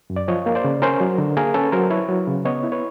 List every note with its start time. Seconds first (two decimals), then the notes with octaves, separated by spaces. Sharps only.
0.10 F#2
0.16 D5
0.28 F3 C#5 D#5
0.46 A#3
0.55 C5 D5
0.64 C#3
0.82 C#4 A#4 C5
1.01 F#3
1.18 D3
1.37 A#3 G#4 A#4
1.54 C#4 A4 B4
1.72 F#3 A#4 C5
1.90 E4 B4 C#5
2.09 F#3
2.28 C#3
2.45 B3 C#5 D#5
2.63 E4
2.72 B4 C#5